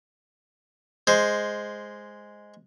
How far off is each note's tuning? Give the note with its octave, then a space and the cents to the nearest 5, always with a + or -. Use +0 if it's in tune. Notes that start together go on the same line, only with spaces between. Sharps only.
G#3 +0 C5 +0